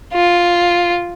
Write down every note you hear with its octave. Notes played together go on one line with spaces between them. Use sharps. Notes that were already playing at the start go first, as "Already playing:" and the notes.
F4